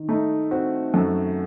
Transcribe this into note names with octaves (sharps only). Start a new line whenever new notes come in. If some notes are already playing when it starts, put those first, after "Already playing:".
Already playing: D#3
A3 D#4
C4 F#4
F#2 A4